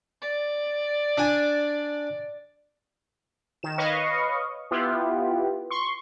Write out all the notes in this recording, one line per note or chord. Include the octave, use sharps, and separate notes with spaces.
D5
D4 G#5
D#3 E7
B4 C#5 D#5 F5 C#6
B3 E4 F4 G4
C6 C#6